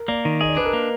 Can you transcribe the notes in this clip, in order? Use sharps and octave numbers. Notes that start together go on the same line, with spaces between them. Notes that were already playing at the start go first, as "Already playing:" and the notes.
Already playing: A#4
A#3 D5
D#3
G#4 D#5
D5
D4 B4
A#4
A#3